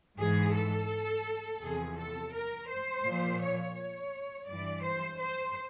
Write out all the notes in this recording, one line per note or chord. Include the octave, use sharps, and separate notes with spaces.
G#2 E3 G#4
A4
E2 C3 F3 G#4
A4
A#4
C5
A#2 F3
C#5
C#5
G2 E3 D5
C5
C5